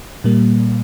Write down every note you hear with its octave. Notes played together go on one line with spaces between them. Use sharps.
A#2 G3 A#3